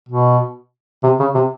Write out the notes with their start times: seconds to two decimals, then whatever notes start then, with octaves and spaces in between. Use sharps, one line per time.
0.09 B2
1.03 C3
1.20 C#3
1.35 C3